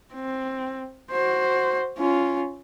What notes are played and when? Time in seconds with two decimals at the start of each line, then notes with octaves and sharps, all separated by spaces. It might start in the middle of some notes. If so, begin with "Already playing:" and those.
0.14 C4
1.11 F#4 C5
1.98 C#4 F4